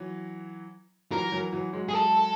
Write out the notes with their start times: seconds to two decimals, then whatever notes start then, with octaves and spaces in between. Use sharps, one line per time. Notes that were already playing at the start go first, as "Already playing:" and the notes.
Already playing: E3 F#3
1.12 E3 F#3 A#4
1.32 E3 F#3
1.53 E3 F#3
1.73 F#3 G#3
1.89 G#4
1.94 A4